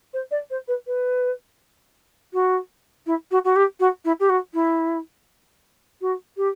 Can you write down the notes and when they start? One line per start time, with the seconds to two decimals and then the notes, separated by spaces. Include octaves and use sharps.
0.13 C5
0.31 D5
0.50 C5
0.68 B4
0.87 B4
2.33 F#4
3.06 E4
3.31 F#4
3.44 F#4
3.56 G4
3.80 F#4
4.05 E4
4.20 G4
4.29 F#4
4.54 E4
6.01 F#4
6.37 G4